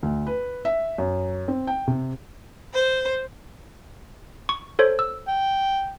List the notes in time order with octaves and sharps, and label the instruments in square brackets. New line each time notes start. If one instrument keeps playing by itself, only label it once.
[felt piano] D2
B4
E5
F#2
C4
G5
C3
[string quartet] C5
[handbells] C#6
A4 C5 C#5
E6
[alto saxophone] G5